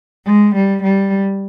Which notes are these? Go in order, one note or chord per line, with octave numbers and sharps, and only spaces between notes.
G#3
G3
G3